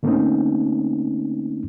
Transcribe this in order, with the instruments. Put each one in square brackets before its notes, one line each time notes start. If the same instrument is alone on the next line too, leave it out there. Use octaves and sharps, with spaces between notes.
[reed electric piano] D3 A3 A#3 C4 C#4 D#4